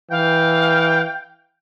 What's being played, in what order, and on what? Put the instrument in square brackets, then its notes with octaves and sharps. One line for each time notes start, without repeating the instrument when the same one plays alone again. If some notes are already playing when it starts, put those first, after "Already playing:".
[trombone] E3 [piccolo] F5 [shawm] G5